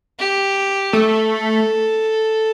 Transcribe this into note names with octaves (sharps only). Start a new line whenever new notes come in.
G4
A3 A4